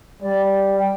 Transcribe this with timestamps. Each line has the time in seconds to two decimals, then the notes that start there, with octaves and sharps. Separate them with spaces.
0.22 G3 D5
0.78 G5